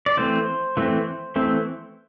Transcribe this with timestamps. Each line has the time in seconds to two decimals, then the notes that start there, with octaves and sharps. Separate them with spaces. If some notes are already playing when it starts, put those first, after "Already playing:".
0.06 D5
0.17 E3 A3 C4 C5
0.77 E3 A3 C4
1.36 E3 A3 C4